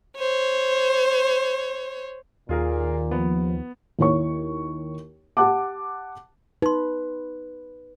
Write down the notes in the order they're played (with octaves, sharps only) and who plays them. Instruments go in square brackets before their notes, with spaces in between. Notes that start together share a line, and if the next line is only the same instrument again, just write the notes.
[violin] C5 C#5
[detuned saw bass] D#2 [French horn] A#2 [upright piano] F4 G#4 A#4
[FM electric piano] F3 [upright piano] B3
[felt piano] D#2 E4 C#5 C#6
G4 F#5 A5 D6
[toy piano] D#4 C6 [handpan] B4